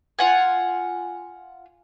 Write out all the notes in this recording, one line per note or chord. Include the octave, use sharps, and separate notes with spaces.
F4 F#5 G#5